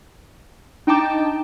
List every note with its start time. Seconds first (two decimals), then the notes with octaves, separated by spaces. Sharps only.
0.87 D4 D#4 G5 A5 D6